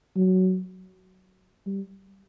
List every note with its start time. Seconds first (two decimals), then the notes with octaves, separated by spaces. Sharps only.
0.16 F#3
1.66 G3